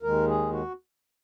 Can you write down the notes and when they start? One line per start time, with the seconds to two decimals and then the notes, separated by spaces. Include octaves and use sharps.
0.02 D#2 D#3 G#3 A#4
0.27 G#4
0.52 F#4